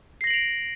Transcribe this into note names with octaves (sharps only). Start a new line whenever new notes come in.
A#6 C7 D7 F7 F#7